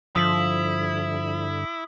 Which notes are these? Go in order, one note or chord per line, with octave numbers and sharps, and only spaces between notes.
G2 D3 F3 E4 D#6 B6 F#7